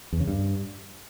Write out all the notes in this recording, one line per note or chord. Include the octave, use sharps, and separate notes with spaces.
E2
C#3
G2